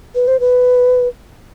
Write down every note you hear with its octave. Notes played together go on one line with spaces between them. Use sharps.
B4
C5
B4